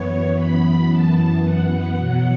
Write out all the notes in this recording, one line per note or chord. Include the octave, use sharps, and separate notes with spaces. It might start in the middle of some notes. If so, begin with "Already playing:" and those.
Already playing: F#2 E3 B3 C#5
B5
A5
F#5
E2 B2 F#3